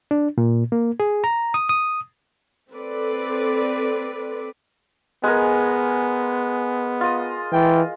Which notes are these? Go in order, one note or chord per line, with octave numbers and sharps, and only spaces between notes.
D4
A#2
A#3
G#4
A#5
D#6
D#6
C4 A4 B4 D5
G#3 B3 G#4 A#4
F4 D#5
E3 G5